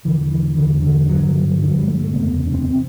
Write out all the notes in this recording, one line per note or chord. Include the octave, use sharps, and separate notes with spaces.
E1 E2 D3 E3
E3
E1 E2 D3 E3
D3
G1 G2 D3 F#3
F#3
E3
G1 G2 D3
F#3
G3
A3
A3
F#1 E2 C3 B3
C4
D4
C4
C3 C4